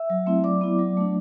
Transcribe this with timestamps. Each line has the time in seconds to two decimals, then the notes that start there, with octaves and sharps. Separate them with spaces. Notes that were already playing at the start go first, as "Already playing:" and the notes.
Already playing: E5 E6
0.10 F#3
0.26 A3 C4 E4
0.44 F#3 D5 D6
0.61 B3 E4
0.79 F#3
0.97 A3 D4